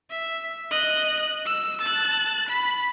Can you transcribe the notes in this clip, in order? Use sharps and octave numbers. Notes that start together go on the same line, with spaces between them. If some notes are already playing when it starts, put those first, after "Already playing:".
E5
D#5 F#6
E6
A5 F#6
B5